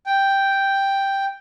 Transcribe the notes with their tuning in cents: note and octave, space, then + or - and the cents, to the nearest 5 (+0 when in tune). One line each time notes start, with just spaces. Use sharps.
G5 +0